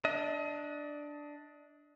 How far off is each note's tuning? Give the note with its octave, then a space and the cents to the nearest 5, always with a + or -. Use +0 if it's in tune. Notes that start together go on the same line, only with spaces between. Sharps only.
D4 +0 D#5 +30